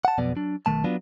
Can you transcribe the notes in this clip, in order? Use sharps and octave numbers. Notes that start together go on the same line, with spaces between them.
F#5 A5
B1 F2 B2 B3 D5
F#3 D4
B1 F#2 D#3 A3 A5
F#3 B3 D4 F4